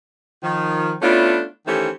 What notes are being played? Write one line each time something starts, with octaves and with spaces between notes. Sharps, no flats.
D#3 F3
A3 B3 C#4 D4 E4 F4
D#3 E3 A3 C#4 G4 C5